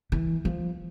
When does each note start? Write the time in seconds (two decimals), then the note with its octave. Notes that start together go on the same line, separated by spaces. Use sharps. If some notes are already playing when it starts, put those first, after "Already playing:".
0.12 E3
0.45 F3